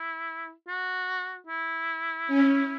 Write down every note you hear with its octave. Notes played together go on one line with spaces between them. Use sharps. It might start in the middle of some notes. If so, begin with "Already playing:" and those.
Already playing: E4
F#4
E4
C#4